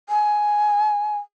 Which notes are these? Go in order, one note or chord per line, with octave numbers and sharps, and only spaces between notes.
G#5